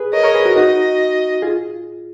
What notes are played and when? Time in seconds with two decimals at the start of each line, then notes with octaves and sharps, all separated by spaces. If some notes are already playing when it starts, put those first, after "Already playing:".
Already playing: G#4 B4
0.13 A#4 C#5 D#5
0.24 A#4 C#5
0.35 G#4 B4
0.45 F#4 A#4
0.56 D#4 F#4 D#5
1.42 F4 G#4